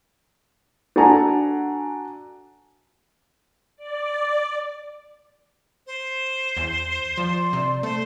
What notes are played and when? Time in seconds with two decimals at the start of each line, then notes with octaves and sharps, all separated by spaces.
0.96 D4 F#4 A4 F#5 G#5 A#5
3.76 D5
5.87 C5
6.57 E2
7.18 F3 D5 C6
7.53 C3
7.83 A3 C5